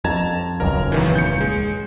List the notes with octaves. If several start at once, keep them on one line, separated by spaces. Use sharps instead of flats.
F2 A5 A#5 G#6
D#1 C#2 F#2 A#4 A#5
E2 D#3 E3
G6 C#7
G#3